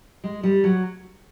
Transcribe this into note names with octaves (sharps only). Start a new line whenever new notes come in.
G#3
G3
F#3